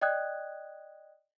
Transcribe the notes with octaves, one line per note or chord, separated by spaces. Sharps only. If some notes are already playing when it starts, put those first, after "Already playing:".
D5 D#5 G5 D#6 F#6 G#6